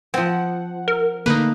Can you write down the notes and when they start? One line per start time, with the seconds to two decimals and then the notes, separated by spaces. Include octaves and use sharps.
0.14 F3 C4 F#5
0.88 A#4
1.26 D3 A3 A#3 D#4 B4